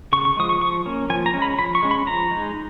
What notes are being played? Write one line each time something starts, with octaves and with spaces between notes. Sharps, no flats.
C#3 C#6
C#6
F3 G#3 D#6
C#6
F3 C#6
A#3 C#4
F3 G#5
A#5
G#3 C#4
B5
F3 B5
C#6
G#3 C#4
B5
F3 A#5
G#3 D#4